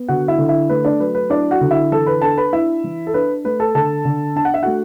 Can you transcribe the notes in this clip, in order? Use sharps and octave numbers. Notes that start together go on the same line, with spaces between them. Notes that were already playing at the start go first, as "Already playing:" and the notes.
Already playing: B3
D3 F#4 F#5
E4 E5
D3
E4 E5
A3 B4
D4 D5
F#3 B4
B4
D4 E4 D5
F#4 F#5
D3
E4 E5
E3 A4 A5
B4 B5
D4 A4 A5
B4 B5
D4 E4 E5
E3
A4
D4 B4
A3 B4
A4 A5
D3 A4 A5
D3
D4 A5
F#5
E5
A3 F#4 F#5